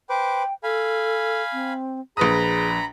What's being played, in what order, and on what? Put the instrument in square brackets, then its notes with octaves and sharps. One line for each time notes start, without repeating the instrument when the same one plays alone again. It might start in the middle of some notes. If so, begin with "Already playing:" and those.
[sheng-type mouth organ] B4 C5 D6 [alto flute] G5
[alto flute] A4 [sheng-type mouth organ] F5 G#5 B5
[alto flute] C4
[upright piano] A#1 B4 D#6 [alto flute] G#4 [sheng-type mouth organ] A#5 B5